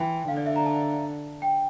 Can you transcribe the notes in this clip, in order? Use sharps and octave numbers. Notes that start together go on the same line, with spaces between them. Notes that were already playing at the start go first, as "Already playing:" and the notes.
Already playing: E3 G5 A5 C6
D3 F5
D5
E5
A#5
A5
G5